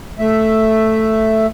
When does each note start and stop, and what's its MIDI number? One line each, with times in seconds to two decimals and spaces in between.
0.19 1.46 57
0.19 1.46 76